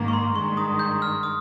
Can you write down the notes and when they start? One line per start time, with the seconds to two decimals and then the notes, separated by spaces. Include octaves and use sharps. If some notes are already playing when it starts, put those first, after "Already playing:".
Already playing: G#2 D#3 A#3
0.08 C#6
0.13 C6
0.36 G2 D#3 G#3 C#6
0.57 D#6
0.79 G6
1.02 F6
1.23 D#6